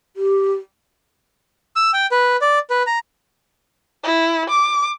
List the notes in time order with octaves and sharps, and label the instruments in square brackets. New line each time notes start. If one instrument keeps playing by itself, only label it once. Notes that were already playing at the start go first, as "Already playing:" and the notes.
[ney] G4
[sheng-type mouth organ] E6
G5
B4
D5
B4
A#5
[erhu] E4
D6